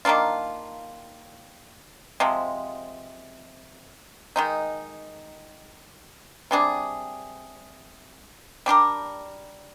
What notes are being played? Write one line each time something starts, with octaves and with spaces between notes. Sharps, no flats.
D#3 A#3 D4 F4
C3 F3 G#3
D#3 G#3 D#4
C3 G3 D4 G#4
G3 D4 G4 A#4